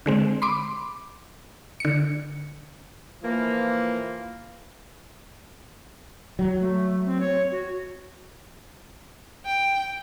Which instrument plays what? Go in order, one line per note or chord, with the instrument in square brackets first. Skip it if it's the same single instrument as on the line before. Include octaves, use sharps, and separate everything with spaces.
[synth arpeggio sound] D3 G#3 C4
B5 C6 D6
D3 C#7
[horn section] E3 F3 A#3
[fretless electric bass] F#3
[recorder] A3
C4
C#5
F#4
[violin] G5